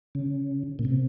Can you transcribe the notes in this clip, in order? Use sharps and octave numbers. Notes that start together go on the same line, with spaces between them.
C#3
A#2
C3